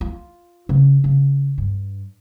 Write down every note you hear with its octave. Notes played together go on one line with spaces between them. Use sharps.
F4
C#3
C#3
G2